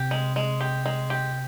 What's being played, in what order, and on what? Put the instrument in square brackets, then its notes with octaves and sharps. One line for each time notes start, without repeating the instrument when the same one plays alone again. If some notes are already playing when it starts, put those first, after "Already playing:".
Already playing: [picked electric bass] C3 [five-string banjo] G4
[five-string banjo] G#3
G#3
G4
G#3
G4